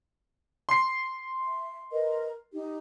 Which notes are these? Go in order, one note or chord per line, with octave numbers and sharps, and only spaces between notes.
C6 C7
E5
A#4 B4 D#5
D#4 G4